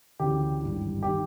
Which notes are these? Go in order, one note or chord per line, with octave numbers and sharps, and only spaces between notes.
D2 C#3 E3 G4
G#1 G2 E3
D#3 G4